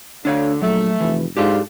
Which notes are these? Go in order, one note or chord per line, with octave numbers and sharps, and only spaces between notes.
D2 D3 D4 C#5 F5
A#1 F#3 A3
F1 E3
G#2 F#3 D4 F4 G4 A4 F5